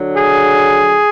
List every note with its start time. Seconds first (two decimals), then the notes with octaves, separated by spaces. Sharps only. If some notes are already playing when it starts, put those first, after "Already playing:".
Already playing: D3 F#3
0.17 G#4